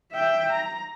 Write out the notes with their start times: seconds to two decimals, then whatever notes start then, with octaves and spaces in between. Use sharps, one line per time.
0.12 E5 G5
0.52 A#5